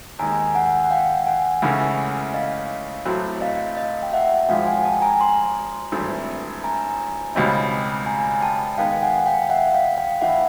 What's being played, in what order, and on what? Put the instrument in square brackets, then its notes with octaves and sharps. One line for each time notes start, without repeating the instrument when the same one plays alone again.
[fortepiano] D#2 D#3 G#3 [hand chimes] G#5 A#5
[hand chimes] F#5 G#5
F#5
F5 G5
F#5 G#5
[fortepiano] C#2 C#3 E3 A3
[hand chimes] D#5 F5
[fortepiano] A1 A2 F#3 A3 C4
[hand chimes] D#5 F5
D#5 F5
G5
E5 F#5
[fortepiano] G#1 G#2 F3 G#3 [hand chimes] F5 G5
[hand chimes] F#5 G#5
G5 A5
G#5 A#5
A#5 C6
[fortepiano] G#1 G2 E3 A3 C4
[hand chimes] G#5 A#5
[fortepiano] C#2 B2 G3 C4 D#4
[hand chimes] G#5 A#5
G5 A5
[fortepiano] D#3 G#3 B3 [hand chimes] F5 G5
[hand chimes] F#5 G#5
F5 G5
E5 F#5
F5 G5
F5 G5
[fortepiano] A2 E3 [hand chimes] E5 F#5